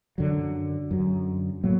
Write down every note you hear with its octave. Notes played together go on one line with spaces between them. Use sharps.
F#2 D3 F#3
F#2 D3 F#3
A2 F#3 A#3